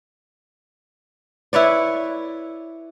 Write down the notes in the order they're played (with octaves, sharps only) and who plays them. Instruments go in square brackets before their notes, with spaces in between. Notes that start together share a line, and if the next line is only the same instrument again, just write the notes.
[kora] E4 B4 C#5 D5